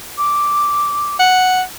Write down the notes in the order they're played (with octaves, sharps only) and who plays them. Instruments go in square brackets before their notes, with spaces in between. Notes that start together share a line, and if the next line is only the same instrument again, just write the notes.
[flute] D6
[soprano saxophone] F#5